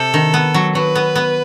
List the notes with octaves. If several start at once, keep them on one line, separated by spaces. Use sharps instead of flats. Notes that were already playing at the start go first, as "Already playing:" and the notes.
Already playing: C3 A4
D#3
B3
F#3
F#3 B4
B3
B3